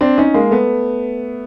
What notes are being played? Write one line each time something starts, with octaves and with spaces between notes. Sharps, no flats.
C4 D4
C#4 D#4
G#3 A#3
A3 B3